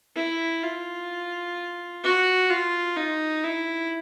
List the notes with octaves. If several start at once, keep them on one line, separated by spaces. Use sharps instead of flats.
E4
F4
F#4
F4
D#4
E4